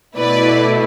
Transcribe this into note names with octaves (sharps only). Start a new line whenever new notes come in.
B2 A3 E4 B4 D5